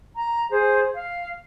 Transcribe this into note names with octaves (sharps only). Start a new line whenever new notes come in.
A#5
G#4 C5
F5